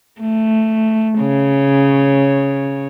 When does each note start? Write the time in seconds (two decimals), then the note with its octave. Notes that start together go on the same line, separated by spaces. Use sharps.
0.20 A3
1.19 C#3 C#5